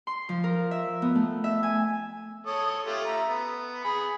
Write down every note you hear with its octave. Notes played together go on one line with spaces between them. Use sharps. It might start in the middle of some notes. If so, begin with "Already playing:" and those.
C6
F3
A#4
E5
B3
A3
E5
G#5
A4 C#5 D#6
A3 F4 G4
E5 A#5
B3
G#4 B5